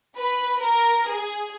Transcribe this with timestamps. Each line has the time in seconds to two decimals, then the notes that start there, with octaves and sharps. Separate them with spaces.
0.16 B4
0.62 A#4
1.07 G#4